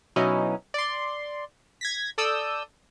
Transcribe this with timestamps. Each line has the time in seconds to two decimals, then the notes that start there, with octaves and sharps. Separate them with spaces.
0.16 B2 F#3 C#4 D#4 E4
0.74 D5 C6
1.81 G#6 A#6 B6
2.18 A4 D5 D#6 E6 G6